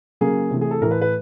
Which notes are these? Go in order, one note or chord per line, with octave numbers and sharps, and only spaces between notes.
C#3 F#3 A#3 G#4
C3 E3 A3
G#4
A4
A2 E3 A3 A#4
B4
B4